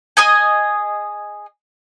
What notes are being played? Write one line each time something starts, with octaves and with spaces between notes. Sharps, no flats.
G#4 D#5 G#5